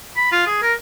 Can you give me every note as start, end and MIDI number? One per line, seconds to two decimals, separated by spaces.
0.17 0.28 83
0.32 0.44 65
0.46 0.58 68
0.62 0.73 70